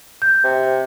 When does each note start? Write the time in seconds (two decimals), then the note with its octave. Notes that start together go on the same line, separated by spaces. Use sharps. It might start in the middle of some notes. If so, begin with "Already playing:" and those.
0.22 G6
0.44 C3